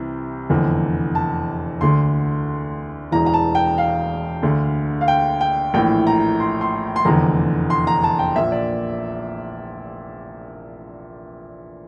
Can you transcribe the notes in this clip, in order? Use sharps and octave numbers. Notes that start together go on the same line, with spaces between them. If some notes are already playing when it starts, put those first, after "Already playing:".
Already playing: C2 C3 E3
F1 E2 D3
A5
D2 D3 C6
E1 E2 E3 A#5
A#5
A5
G5
F5
D2 D3
F5
G5
G5
A#1 A2 E3 G5
A#5
C6
C6
C6
F1 E2 D3 A#5
C6
A#5
A5
G5
A#1 A#2 E5
D5